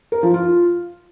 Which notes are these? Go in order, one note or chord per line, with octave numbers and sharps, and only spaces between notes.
A#4
F3
F4